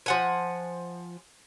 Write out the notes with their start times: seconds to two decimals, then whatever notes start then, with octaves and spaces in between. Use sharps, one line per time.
0.06 F3 F#5 G#5